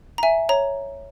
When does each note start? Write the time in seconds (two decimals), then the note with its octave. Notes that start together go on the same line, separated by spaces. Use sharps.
0.18 A#5
0.23 E5 G#5
0.49 C#5 A#5